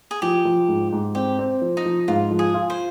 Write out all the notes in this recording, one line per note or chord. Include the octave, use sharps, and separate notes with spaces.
G#4
F3 G4
F3
G#2
G#2
C4 G4
C4
F3
D#4
F3
G#2 F4
F3
G#4
F4
C5